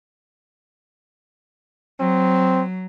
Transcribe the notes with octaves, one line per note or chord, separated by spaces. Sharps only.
F#3 C4